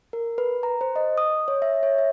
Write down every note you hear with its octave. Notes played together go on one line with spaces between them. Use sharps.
A#4
B4
A#5
C5
D#5
D#6
C#5
E5
C#5
E5